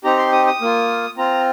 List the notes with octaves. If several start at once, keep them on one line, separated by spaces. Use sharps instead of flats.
C4 D#4 G4 A#5
C6
D#6
D#6
A#3 F4
C4 F4 A#5